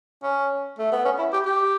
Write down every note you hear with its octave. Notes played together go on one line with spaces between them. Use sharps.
C#4
A3
B3
C#4
E4
G4
G4